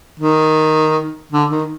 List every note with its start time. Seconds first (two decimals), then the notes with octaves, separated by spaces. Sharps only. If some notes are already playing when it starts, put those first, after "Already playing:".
0.20 D#3
1.32 D3
1.50 D#3